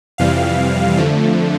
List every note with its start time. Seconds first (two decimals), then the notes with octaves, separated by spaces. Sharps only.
0.18 F2 C3 E3 G3 F5
0.97 F2 D3 F3 A3